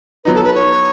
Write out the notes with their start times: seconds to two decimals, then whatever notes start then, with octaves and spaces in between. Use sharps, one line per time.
0.25 F#3 B3 D#4 B4
0.35 A4
0.44 B4
0.54 C#5